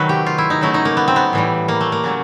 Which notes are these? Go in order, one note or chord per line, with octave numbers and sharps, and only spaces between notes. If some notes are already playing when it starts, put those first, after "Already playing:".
Already playing: C3 D#3 F#3 A3 B4
G4
F4
E4
D#4
C#3 F#3 A3 E4
D#4
A#3
B3
C4
B3
A2 E3 G3
A#3
A3
A#3
C#3 F#3 A3